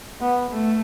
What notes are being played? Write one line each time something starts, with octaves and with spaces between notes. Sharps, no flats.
B3
A3